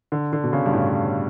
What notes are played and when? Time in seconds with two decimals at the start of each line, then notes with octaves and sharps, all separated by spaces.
0.12 D3
0.33 D3
0.44 B2
0.53 C#3
0.66 G2
0.73 A2